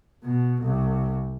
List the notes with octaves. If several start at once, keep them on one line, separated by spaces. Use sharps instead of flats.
B2
C2